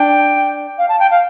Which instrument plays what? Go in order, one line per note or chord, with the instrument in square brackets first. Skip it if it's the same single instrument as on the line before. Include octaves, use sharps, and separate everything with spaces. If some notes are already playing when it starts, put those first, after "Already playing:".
Already playing: [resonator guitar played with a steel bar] D4 [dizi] G5
[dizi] F5
A5
G5
F5